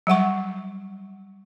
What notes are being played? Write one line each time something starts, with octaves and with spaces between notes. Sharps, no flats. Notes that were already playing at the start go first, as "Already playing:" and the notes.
F#3 G3 F#5 C#6